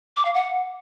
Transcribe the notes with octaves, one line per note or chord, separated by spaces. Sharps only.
D6
F5
F#5